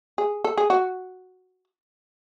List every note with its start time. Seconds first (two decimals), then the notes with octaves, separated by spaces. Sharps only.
0.18 G#4
0.44 A4
0.57 G#4
0.70 F#4